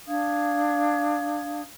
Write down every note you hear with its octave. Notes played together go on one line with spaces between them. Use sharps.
D4 F5 D#6 G#6